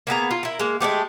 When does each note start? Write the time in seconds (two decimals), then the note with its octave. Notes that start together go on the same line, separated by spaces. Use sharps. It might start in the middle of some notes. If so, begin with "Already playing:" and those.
0.07 A#3 B3 G#4 A#5
0.31 F4
0.43 E4 A#4
0.59 G#3 A#3
0.81 G#3 A3 B3 G4